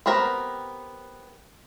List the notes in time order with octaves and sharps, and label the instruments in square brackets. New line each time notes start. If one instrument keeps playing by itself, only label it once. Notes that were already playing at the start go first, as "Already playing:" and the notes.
[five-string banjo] B3 C4 G4 A#4 A#5